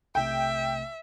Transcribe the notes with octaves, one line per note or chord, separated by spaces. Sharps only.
B1 C3 A3 E5 G5